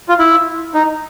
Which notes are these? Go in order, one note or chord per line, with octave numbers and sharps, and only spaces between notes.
F4
E4
D#4